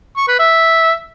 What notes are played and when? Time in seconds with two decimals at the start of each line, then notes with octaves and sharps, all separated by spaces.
0.17 C#6
0.28 B4
0.40 E5